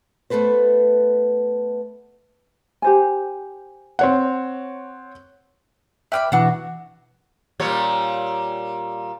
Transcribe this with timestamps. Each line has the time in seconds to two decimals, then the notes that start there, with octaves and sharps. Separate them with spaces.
0.30 A3 B3 A4 B4 C5
2.82 G4 C5 G#5
3.99 C4 C#5 F#5
6.12 B4 D5 E5 G5 B5 F6
6.32 B2 E3 D4 F#4
7.60 A#2 G3 C#5